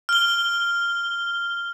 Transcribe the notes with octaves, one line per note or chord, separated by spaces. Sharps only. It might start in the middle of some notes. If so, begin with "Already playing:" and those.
F6 G7